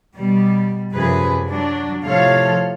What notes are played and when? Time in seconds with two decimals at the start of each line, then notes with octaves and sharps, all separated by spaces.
0.16 B2 G3
0.93 F#2 C3 F3 G#4 B4
1.47 F#3 D4 F#4
2.04 A2 C3 F3 A4 C#5 F5